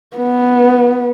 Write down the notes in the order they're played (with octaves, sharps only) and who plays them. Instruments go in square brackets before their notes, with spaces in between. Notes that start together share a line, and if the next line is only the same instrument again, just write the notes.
[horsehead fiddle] B3